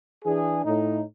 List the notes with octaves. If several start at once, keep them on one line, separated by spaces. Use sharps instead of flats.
E3 D4 G#4
A2 D#4